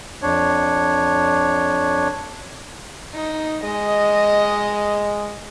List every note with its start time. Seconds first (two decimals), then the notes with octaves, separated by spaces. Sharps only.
0.22 F2 D4 C#5
3.15 D#4
3.64 G#3 D#5